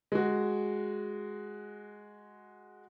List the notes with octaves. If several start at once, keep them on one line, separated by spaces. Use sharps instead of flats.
G#3 F#4